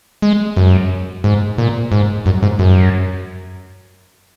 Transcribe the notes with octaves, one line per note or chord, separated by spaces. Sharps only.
G#3
F#2
G#2
A#2
G#2
F#2
G#2
F#2